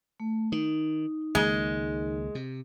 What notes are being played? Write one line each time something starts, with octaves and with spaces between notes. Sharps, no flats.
A3
D#3 D#4
C#2 D#3 G#3 A#3
C3